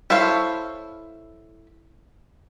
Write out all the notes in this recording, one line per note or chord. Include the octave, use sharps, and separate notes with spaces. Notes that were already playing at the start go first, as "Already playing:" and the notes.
E4 A4 C5 C#5 F5